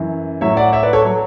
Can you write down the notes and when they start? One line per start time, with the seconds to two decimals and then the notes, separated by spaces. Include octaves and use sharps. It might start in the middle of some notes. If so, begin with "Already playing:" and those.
Already playing: F#2 E3
0.41 A2 F#3 C#5 E5
0.57 D5 F#5
0.72 C#5 E5
0.83 B4 D5
0.93 A4 C#5
1.05 F#3